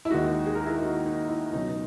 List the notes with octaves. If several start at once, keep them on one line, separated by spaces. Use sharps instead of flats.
E4
D#2 D#3 G#3 D#4 F#4
G#4
A#4
E4 G#4
D#4 F#4
D#4
E4
C#2 B2 F#3 D#4